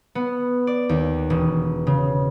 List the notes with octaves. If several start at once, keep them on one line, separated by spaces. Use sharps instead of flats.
B3
D5
D#2
E1
C#3